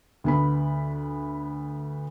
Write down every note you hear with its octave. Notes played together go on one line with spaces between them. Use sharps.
D2 B3 B5